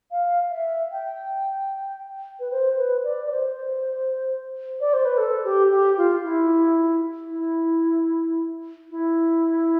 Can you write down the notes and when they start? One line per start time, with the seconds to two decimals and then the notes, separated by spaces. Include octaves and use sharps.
0.11 F5
0.51 E5
0.92 G5
2.40 B4
2.51 C5
2.78 B4
3.04 D5
3.26 D5
3.31 C5
4.80 D5
4.93 C5
5.05 B4
5.18 A4
5.45 G4
5.71 G4
5.97 F4
6.24 E4
7.31 E4
8.91 E4